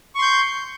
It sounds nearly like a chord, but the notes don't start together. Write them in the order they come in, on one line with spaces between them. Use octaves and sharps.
C#6 C6 G6